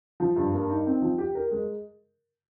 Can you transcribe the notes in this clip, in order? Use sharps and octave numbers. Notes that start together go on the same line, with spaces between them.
F3
G2
A#3
D#4
C4
F3
G4
A#4
G#3